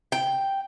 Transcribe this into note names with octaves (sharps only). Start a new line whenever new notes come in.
G5